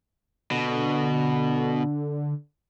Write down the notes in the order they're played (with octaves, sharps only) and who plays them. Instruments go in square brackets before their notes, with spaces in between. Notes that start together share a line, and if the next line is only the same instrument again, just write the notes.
[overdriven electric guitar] B2 [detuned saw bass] D3